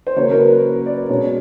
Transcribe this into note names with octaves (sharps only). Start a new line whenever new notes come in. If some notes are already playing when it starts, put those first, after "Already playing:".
C5
C#3 F#3 A#3 C#5
A#4
B4
D5
B2 G#3 C#4 C#5